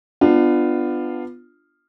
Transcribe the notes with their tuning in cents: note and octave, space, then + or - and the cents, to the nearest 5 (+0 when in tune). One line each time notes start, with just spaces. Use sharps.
B3 +15 D4 +25 F4 +0